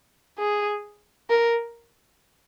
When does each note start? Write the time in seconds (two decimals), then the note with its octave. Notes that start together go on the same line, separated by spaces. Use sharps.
0.39 G#4
1.30 A#4